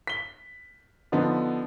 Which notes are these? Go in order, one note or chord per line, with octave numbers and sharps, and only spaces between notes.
B6 G7
D3 F3 B3 D#4